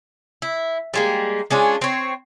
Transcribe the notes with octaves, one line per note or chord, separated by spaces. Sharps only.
E4
G3 G#3 A#3
G#3 C#4 D4 F4
C4 C#5